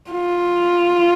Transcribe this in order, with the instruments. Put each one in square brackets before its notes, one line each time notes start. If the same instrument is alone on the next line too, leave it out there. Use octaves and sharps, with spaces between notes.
[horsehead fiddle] F4